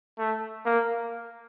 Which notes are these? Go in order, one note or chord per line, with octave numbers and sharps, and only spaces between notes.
A3
A#3